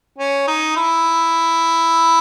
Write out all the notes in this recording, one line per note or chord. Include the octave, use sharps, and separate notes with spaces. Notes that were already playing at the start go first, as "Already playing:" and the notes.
C#4
D#4
E4